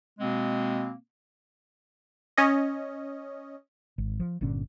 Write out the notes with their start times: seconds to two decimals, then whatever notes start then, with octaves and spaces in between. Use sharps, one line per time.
0.19 B2 G#3 A#3 C4
2.37 C#4 D#5
3.98 G#1
4.20 F3
4.41 G1 A#2 D3 C#4